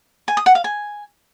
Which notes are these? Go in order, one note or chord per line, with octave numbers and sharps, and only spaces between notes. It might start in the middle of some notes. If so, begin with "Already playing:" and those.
G#5
D#6
F#5
F5
G#5